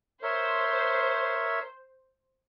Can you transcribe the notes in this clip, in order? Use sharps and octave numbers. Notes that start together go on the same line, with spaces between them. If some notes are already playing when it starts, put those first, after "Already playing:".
A#4 C5 C#5 E5